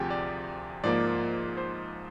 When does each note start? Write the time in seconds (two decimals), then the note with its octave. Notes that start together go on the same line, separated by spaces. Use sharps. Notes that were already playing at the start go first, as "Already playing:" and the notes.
Already playing: D2 C3 F3 G4 G#4
0.10 D5
0.84 G#2 F3 A#3 D5
1.57 C5